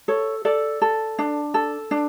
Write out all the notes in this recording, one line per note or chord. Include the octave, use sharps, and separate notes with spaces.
A4 C#5
A4 D5
A4
D4
A4
D4